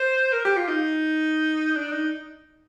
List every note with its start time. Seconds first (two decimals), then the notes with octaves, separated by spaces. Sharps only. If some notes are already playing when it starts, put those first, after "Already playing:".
Already playing: C5
0.33 A#4
0.45 G4
0.57 F4
0.68 D#4
1.76 D4
1.92 D#4